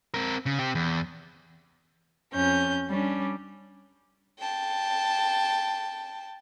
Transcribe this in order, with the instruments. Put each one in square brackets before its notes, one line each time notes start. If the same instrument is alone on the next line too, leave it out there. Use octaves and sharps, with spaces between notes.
[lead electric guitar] C4 A#4
C#3
C4 G4
E2
[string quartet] F2 C#4 G6
G3 C#4 D4
[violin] G5 A5